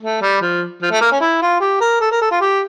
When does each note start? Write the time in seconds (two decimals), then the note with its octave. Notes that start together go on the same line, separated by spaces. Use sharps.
0.02 A3
0.22 G3
0.41 F3
0.82 F3
0.91 A3
1.01 A#3
1.12 C#4
1.21 E4
1.42 F4
1.60 G4
1.81 A#4
2.01 A4
2.11 A#4
2.21 A4
2.31 F4
2.41 G4